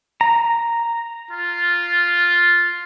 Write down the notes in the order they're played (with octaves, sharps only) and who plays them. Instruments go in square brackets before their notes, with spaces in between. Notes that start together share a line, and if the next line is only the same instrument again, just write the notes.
[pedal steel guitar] A#5
[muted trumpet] F4